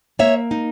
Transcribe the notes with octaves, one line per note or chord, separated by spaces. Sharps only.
A#3 C#5 E5
D#4